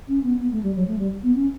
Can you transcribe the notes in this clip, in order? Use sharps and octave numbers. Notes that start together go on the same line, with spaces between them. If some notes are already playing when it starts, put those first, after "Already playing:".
C#4
B3
B3
A3
G3
F#3
A3
G3
B3
C#4